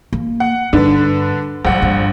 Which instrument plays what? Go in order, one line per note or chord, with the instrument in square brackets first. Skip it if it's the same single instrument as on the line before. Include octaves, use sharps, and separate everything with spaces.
[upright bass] A#3
[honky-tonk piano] F#5
[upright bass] G2 [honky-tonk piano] D3 D4 B4
[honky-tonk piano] A#1 F#5 [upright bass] F3 F#3
[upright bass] G2